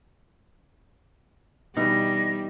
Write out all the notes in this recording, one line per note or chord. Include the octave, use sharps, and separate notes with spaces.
B2 E3 G3 D#4 A#6